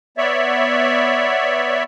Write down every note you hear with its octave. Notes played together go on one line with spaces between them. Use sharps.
B3 C#5 D5 E5